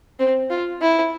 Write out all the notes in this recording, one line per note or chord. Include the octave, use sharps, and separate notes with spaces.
C4
F4
E4